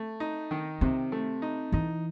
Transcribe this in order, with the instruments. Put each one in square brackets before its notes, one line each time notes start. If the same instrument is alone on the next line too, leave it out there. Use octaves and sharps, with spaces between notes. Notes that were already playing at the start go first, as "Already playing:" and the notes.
Already playing: [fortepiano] A3
D#4
D#3
[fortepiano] C3 [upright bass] C4
[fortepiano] A3
D#4
[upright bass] E3 [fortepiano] D#4